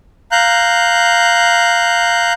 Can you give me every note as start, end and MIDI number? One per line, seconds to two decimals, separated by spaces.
0.32 2.33 77
0.32 2.33 82
0.32 2.33 90
0.32 2.33 91